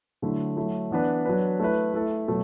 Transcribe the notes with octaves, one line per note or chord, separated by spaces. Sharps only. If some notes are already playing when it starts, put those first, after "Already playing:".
D3 F#3 A3 E4
F#3 A3 E4
E3 B3 D4 B4
F#3 D4 B4
A3 E4 B4
A3 E4 A4
B2 F#3 A3